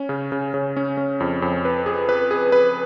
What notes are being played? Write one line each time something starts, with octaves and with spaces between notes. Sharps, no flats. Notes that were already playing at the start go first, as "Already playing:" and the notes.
Already playing: C#4
C#3
C#3
C#3
C#4
C#4
F2
F2
B4
G#4
B4
G#4
B4